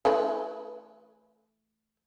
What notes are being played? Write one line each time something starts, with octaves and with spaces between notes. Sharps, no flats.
E3 A3 B4